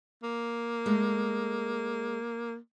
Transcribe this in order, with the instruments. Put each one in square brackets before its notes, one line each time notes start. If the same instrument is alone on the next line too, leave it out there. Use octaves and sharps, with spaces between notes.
[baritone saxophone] A#3
[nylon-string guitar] G#3 A3